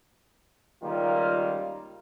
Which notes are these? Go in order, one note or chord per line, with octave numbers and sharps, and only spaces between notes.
C#2 D#3 G3 A#3 F4